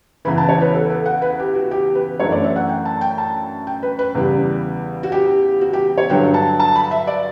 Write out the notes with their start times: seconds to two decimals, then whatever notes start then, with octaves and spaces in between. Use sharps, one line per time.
0.25 E2 C#3 E3 B5
0.38 A5
0.49 C#5
0.61 B4
0.74 A4
0.90 B4
1.06 F#5
1.22 B4
1.39 G4
1.55 F#4
1.71 G4
1.95 B4
2.20 F#2 E3 A3 D4 C#5
2.32 D5
2.44 E5
2.56 F#5
2.69 G5
2.85 A5
3.01 G5
3.18 A5
3.67 G5
3.83 B4
3.99 B4
4.15 E2 C#3 G3
5.03 F#4
5.12 G4
5.61 F#4
5.73 G4
5.98 C#5
6.10 G2 D3 F#3 G5
6.34 A5
6.60 A5
6.76 B5
6.91 E5
7.07 D5